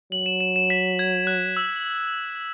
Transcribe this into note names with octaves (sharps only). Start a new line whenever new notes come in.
F#3 F#7
E7
E7
E7
B6
G#6
F#6
E6